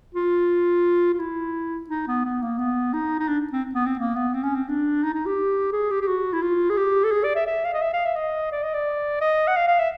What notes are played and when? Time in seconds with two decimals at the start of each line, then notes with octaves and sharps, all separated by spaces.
0.15 F4
1.13 F4
1.19 E4
1.90 D#4
2.07 B3
2.25 B3
2.42 A#3
2.59 B3
2.93 D#4
3.19 D#4
3.28 D4
3.53 C4
3.75 B3
3.86 C4
3.99 A#3
4.16 B3
4.34 C4
4.43 C#4
4.55 C4
4.69 D4
5.03 D#4
5.14 D#4
5.26 G4
5.72 G#4
5.91 G4
6.01 G4
6.08 F#4
6.33 E4
6.42 F4
6.69 G#4
6.77 G4
7.04 A4
7.11 G#4
7.24 D5
7.36 E5
7.47 E5
7.65 F5
7.74 D#5
7.82 E5
7.93 F5
8.05 E5
8.16 D#5
8.52 D5
8.63 D#5
8.74 D5
9.21 D#5
9.47 F#5
9.56 F5
9.68 F5
9.79 E5